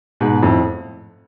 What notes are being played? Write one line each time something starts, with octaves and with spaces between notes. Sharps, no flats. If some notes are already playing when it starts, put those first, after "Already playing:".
G#2 B2
F2 A2